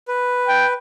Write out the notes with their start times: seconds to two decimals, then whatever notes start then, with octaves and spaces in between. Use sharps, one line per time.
0.08 B4
0.48 G5